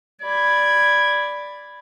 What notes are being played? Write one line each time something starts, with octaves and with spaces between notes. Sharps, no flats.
D5 B5 G#6